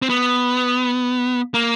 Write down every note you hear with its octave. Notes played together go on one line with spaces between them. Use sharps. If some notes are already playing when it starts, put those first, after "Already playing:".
C4
B3
A#3